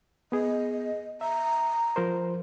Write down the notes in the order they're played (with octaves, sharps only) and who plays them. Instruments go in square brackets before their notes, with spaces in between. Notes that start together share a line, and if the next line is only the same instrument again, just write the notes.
[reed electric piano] B3 G#4 [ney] D#5
[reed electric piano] E5 [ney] A#5
[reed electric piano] F3 A#4 C5